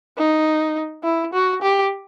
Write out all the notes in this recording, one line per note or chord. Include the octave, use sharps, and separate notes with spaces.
D#4
E4
F#4
G4